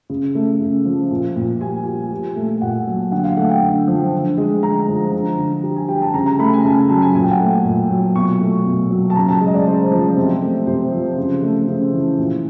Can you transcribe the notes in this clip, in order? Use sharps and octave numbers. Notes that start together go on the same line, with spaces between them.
C#3
A3
C#3
F3
A#2
A#2
G3 G#5
G3
A#2
A3
A#2 F#5
F#3
D3 F#5
F5
A3 F#5
G5
D3
F3
D3
G#3
D3 A#5
F3
D3
D3
G3
G#5
G3 G5
A5
C#3 A#5
A#5
A3 B5
G#5
C#3 A5
G#5
F#3 A5
G#5
A#2 G#5
G5
F#5
A3 G5
A#2
F#3
B2 C#6
A3
B2
F#3
A5
C#3 A#5
A5
G#3
D#5
D5
C#3 C5
F3
C3
A3
C3 C5
F3
C#3
A3
C#3
E3
A#2